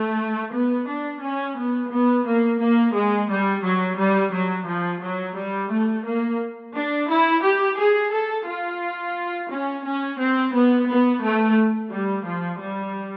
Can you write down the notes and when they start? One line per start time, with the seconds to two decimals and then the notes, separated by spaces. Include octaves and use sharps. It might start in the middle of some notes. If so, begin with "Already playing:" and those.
Already playing: A3
0.53 B3
0.88 D4
1.23 C#4
1.57 B3
1.91 B3
2.26 A#3
2.60 A#3
2.95 G#3
3.30 G3
3.64 F#3
3.98 G3
4.33 F#3
4.67 F3
5.02 F#3
5.36 G3
5.71 A3
6.05 A#3
6.74 D4
7.09 E4
7.43 G4
7.78 G#4
8.12 A4
8.47 F4
9.51 C#4
9.84 C#4
10.19 C4
10.54 B3
10.88 B3
11.23 A3
11.91 G3
12.26 F3
12.61 G3